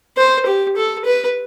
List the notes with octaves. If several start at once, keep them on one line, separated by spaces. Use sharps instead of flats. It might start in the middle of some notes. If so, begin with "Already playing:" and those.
C5
G4
A4
B4